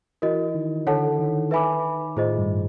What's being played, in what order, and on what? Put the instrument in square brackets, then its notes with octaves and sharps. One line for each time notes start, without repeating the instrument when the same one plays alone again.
[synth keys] E3 E4 [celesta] F#4 A#4 D#5
[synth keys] D#3 D#4
[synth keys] D3 D4 [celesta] A4 C#5 F#5 A5
[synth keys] D#3 D#4
[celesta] B4 E5 G#5 B5 D6
[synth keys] A2 A3 [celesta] F4 G#4 C5 D#5
[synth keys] G2 G3